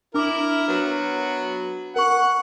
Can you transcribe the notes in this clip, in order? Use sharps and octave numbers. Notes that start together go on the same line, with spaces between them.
D4 E4 A#4 D6
F#3 B3
A#4 F#5 C#6